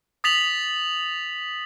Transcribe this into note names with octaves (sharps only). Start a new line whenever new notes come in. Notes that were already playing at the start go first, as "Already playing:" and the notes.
D#6 A6 B6 F7 F#7